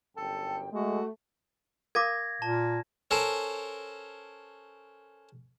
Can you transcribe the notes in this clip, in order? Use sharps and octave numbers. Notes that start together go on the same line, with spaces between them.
G1 F#2 A4 G5
G#3 A3 F#4
A#4 F5 D6 G#6 A#6
A#2 A5
C#4 A4 A#4 C5